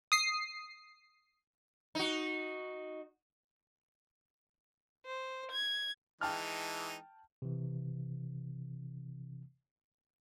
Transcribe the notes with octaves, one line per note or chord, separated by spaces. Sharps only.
D#6 C7
D#4 F#4
C5
G#6
E3 G#3 D#4 G5 A5 F6
C3 E3